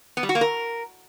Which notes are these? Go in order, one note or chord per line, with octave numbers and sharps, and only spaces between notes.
B3
G3
F#4
A#3
A#4